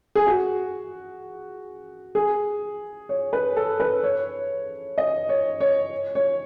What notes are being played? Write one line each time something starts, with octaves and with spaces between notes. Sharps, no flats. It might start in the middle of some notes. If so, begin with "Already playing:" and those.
G#4
F#4
G#4
C#5
B4
A4
B4
C#5
D#5
C#5
C#5
C#5